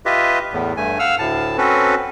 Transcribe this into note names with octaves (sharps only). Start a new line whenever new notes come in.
F4 G4 B4 D#5 E5
E2 A2
G2 A3 G#5
F5 F#5 E6 F6
D2 A2 A5
C4 C#4 F#4 A4 B4